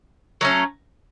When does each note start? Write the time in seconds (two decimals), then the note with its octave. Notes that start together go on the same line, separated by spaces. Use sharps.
0.41 F#3 A3 C#4